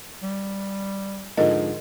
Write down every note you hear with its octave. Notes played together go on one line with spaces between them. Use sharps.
G3
G#2 D3 F3 A#4 D#5